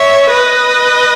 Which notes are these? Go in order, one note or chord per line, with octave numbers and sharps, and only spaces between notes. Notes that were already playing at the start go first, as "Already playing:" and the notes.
Already playing: C#5 E5
B4 D#5